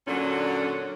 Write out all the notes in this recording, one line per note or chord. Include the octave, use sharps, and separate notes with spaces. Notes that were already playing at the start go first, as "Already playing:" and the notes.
A#2 D3 F#3 C#4 D4